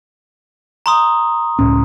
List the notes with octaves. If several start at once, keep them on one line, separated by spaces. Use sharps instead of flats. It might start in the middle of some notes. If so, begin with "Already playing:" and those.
A#5 C6 D#6
C#2 A2 C#4